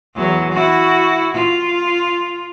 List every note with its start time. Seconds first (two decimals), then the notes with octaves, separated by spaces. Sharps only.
0.15 E2 F#3
0.52 E4 F#4
1.34 F4